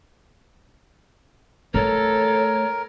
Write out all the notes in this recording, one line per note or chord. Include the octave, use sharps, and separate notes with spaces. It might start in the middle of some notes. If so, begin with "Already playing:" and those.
E3 A3 A4 A#4 C#5